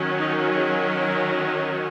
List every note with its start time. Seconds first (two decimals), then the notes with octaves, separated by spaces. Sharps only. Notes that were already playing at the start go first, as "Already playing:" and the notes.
Already playing: D#3 F#3 C#4
0.19 D#4
0.56 G#4
0.94 A#4